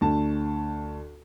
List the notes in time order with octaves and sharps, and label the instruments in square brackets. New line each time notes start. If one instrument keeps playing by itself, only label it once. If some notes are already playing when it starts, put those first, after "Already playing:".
[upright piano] D2 A5